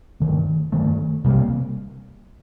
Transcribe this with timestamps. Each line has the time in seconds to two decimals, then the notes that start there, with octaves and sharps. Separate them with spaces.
0.20 G2 D#3 A3
0.72 G2 D#3 A3
1.24 C3 G3 A#3